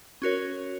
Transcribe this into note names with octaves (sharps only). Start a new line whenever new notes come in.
C#4 F#4 A#4 C#5